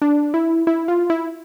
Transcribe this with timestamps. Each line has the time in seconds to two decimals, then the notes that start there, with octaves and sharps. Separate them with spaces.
0.02 D4
0.34 E4
0.67 E4
0.88 F4
1.10 E4